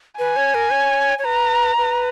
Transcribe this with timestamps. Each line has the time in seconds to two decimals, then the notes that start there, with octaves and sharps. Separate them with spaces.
0.19 B4 G#5
0.36 C#5
0.54 A#4
0.72 C#5
1.19 C#5
1.25 B4 A#5
1.78 B4